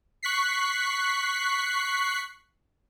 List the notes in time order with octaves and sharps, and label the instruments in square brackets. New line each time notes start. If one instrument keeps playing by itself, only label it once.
[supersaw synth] C#6 F#6 B6 C7